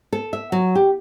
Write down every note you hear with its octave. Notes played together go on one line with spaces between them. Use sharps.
A4
E5
F#3
G4